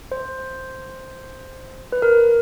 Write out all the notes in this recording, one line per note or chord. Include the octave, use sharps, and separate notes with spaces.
C5
B4
A#4